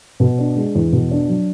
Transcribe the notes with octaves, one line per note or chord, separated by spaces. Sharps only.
B2
D4
G#3
E2
B2
D4
F#3